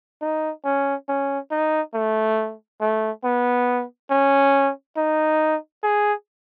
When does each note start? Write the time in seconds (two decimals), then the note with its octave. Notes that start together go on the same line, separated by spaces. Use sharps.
0.22 D#4
0.64 C#4
1.09 C#4
1.51 D#4
1.94 A3
2.81 A3
3.25 B3
4.10 C#4
4.97 D#4
5.83 G#4